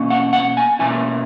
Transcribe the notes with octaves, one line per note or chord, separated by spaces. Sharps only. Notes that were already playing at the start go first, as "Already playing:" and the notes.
Already playing: B2 A#3 C#4
F#5
F#5
G#5
B2 A#3 C#4 E4 G#5